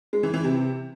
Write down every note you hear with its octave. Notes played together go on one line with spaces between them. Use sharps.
G#3
E3
E3
C3